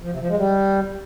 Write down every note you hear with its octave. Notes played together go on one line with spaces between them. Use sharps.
F3
C3
F3
G#3
G3